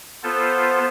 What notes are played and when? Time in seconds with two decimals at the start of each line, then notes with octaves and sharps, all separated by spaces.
0.23 B3 F4 A4 C5